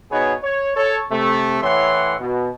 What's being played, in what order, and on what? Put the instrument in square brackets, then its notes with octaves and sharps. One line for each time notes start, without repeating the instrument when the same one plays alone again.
[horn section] B2 B3 D#4 G#4 B4 C#5
C#5
A4 C#5
C3 A3
A2 E3 C#5 E5 F#5 C6
B2